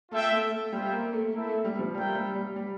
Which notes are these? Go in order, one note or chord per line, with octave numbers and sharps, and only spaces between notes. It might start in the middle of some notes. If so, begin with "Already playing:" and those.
A3 F4 A4 E5 G5
A3
A3
G3 F4 C5 E5 G5
A#3
A3
A#3 C4 E4 A4 E5
A3
G3
F3
G3 F4 A#4 E5 G5
G3
G3
G3